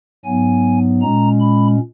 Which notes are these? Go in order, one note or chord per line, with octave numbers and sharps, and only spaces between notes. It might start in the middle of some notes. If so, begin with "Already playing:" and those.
G#2 F#3 B3 G#5
A#2 G#3 C#4 A#5
B5